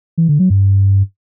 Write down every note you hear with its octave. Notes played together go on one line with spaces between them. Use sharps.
E3
D3
F#3
G2